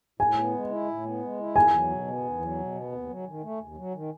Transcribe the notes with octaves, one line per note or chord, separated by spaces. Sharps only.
A2 G#5
B3
G#3
E4
A2
B3
G#3
E4
E2 G#5
F#3
B2
B3
E2
F#3
B2
B3
D#2
F#3
D#3
A3
D#2
F#3
D#3